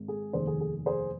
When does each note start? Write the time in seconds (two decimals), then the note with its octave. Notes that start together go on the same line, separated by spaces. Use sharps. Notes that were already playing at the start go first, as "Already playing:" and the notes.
Already playing: G#1 G#2 G#3
0.08 G#4
0.33 F1 D#2 D#3 G#4 C5
0.47 G#4
0.61 G#4
0.86 G#4 C5